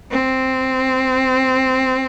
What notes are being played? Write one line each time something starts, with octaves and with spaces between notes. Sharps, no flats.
C4